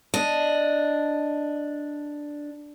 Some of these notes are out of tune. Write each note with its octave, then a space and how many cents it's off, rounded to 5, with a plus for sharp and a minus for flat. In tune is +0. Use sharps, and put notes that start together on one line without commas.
D4 +0 D#5 +0